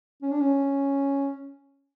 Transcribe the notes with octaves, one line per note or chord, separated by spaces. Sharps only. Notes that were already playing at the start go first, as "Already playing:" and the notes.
C#4
D4
C#4